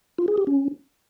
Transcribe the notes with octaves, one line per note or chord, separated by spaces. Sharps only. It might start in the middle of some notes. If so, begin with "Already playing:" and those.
F4
G#4
G4
C#4